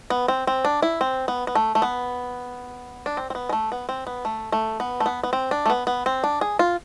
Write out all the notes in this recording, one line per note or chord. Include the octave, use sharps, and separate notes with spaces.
B3
C4
C4
D4
E4
C4
B3
B3
A3
A3
B3
D4
C4
C4
B3
G#3
A3
B3
C4
B3
A3
A3
B3
A3
B3
B3
C4
D4
A3
B3
B3
C4
D4
G#4
F4